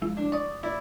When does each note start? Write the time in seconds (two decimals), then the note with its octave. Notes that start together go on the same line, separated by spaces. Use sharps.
0.02 F3 G#3 E4
0.17 D4
0.32 D5 C#6 D#6
0.63 E4 D5